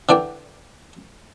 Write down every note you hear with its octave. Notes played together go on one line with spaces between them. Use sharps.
D3 E3 D5 G5